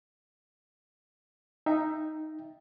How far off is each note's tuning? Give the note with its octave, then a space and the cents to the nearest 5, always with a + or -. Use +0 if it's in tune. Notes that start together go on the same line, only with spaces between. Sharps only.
D#4 +0 E5 +15 G5 +0